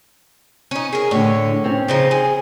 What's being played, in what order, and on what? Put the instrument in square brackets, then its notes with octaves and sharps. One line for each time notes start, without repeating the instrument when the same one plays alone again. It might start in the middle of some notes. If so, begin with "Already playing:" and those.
[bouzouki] C#4 D#4
G#4 A#4
[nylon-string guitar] A2 D3 [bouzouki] C#5
[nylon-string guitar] C4 C#4
[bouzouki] C#3 F3 D#4
G#4